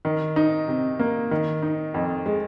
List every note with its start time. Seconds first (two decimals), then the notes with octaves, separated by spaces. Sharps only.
0.05 D#3
0.36 D#4
0.68 C3
0.99 A#3
1.31 D#3
1.62 D#4
1.94 F2
2.26 G#3